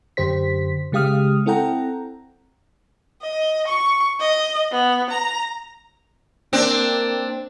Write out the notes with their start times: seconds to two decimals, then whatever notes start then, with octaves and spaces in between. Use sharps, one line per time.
0.17 F#2 D3 G4 C5 B6
0.92 C#3 G#3 G4 F5 D#6 F6
1.46 C4 E4 A4 F#5 G5 A#5
3.22 D#5
3.68 C#6
4.20 D#5
4.72 B3
5.10 A#5
6.53 A#3 C4 D4